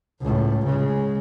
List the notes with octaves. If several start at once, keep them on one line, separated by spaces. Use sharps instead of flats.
C#2 A2
C#3 G#3